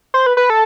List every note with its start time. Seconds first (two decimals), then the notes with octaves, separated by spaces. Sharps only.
0.14 C5
0.26 B4
0.37 B4
0.50 A4